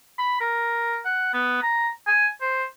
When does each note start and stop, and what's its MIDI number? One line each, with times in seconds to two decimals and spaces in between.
0.18 0.39 83
0.40 1.00 70
1.05 1.28 78
1.33 1.59 59
1.62 1.89 82
2.07 2.27 80
2.41 2.64 72